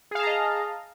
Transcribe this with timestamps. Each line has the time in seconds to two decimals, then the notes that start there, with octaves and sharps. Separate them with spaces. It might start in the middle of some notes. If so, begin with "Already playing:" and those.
0.11 G#4
0.15 F5
0.19 A5
0.23 A#5
0.27 D#5